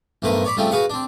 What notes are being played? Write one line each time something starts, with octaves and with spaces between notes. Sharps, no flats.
B1 G2 A3 A#3 B4 C5
C#5 D5 B5
C#3 F3 G3 A3 C4
F#4 G#4 B4 F5 F#5
C4 D4